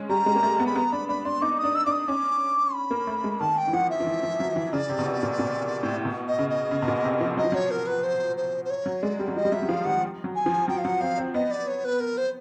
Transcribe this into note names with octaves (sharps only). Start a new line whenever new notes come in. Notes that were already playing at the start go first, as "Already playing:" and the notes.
Already playing: G#3 C#4
G3 A#5
G#3
A#3
A3
B3
B5
B3 A#5
D4 B5
D4 B5
D4 C6
D#4 D6
D#6
D4
E6
D4 D6
D#6
C#4 D6
B5
A#3
A3
G#3
D#3 A5
G5
E3
F3 F#5
E5
F3
E3
F3
F#3
E3
C#3 D5
C3
B2
C3
A#2
A#2
A2
B2
D#5
C#3
D#5
C#3
B2
A#2
C3
F3
F#3 D#5
F3
F#3 C#5
A#4
B4
C5
C5
C5
C#5
F#3
G#3 D5
G3
F#3
F3 D#5
G3
F#3 E5
F#3
F3 F5
D#3 F#5
F#3
G#5
F3
F#3 G5
F5
F#3 F#5
C4 F5
C4
B3 D#5
D5
C#5
B4
A#4
C5